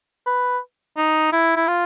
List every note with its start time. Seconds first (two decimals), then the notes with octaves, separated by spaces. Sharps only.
0.27 B4
0.97 D#4
1.32 E4
1.56 E4
1.68 F4